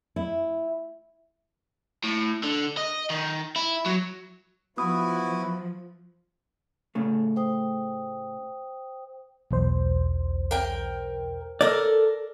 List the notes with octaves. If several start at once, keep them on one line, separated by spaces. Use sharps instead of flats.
E4
A2
D3
D#5
D#3
E4
F#3
F3 B3 E4 F#4 B4 D#6
A2 C#3 A3
C5 G5 D#6
B1 E2 C5
A#4 G5
A4 A#4 D5